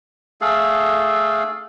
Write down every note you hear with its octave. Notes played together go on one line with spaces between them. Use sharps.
A3 G#4 A4 F5